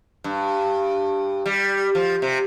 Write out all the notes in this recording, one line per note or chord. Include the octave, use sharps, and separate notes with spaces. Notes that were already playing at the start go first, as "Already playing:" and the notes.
G2
G3
F3
C3